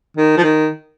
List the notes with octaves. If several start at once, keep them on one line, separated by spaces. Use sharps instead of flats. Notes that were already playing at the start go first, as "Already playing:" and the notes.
D#3
F3
D#3